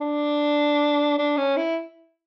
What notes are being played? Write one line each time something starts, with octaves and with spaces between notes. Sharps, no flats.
D4
D4
C#4
E4